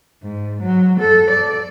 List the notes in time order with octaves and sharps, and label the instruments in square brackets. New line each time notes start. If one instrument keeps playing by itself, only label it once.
[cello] G#2
F#3
A4
D5